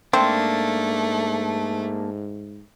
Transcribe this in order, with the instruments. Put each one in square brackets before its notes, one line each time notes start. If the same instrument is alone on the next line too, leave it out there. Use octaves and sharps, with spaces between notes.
[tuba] G#2 [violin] A3 [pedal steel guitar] A#3 D4 [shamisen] C4